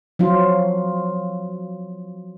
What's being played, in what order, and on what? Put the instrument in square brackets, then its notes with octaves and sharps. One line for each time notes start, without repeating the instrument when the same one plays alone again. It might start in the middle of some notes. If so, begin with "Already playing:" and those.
[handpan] F3 F#3 F4